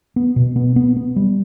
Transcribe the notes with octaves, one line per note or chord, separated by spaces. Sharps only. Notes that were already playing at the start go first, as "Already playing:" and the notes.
B3
B2
B3
B3
B3
G3